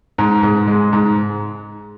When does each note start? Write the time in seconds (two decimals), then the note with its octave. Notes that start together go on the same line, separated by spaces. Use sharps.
0.18 G#2
0.43 G#2
0.67 G#3
0.93 G#2